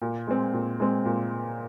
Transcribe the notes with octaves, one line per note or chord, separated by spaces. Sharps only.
A#2
G#3 C4
A#2
G#3 C4
A#2